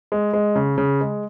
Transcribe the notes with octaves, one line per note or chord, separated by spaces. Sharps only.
G#3
G#3
C#3
C#3
G#3